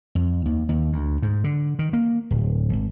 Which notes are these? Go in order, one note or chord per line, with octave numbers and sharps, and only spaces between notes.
F2
D#2
D#2
D2
G#2
D3
D#3
A#3
D1
G#1